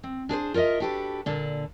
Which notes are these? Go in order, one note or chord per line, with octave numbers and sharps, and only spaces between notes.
C4
D4 G#4 B4 C5
F4 A#4 C#5 D#5 E5
D4 F#4 G4 A4 B4
A#2 D3 D4